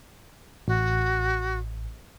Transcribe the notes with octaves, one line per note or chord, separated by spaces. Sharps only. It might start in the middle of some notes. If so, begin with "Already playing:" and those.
A1 F#4